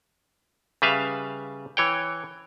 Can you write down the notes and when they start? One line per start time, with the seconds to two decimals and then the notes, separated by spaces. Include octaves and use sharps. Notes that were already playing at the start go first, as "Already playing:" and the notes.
0.82 C#3 G3 B4 E5 F5
1.77 E3 C#5 G5